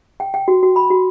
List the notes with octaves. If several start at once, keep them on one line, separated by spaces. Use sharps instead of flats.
G5
G5
F#4
F#4
B5
F#4